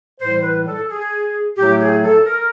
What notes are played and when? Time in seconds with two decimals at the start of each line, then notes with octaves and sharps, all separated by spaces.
0.20 A2 E3 G3 C5
0.43 B4
0.66 A4
0.89 G#4
1.58 A2 F#3 A3 G4
1.80 G#4
2.04 A4
2.26 A#4